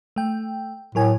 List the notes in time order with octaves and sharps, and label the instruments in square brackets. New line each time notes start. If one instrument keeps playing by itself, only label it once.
[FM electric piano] A3 G5
[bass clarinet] A2 [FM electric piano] F#3 A#4 G#5